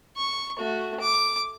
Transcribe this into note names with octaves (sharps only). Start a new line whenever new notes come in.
C#6
A3 F#4
D6